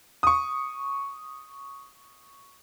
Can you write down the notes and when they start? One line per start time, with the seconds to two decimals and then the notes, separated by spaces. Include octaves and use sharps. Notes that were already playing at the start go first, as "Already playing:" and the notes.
0.23 C#6 D#6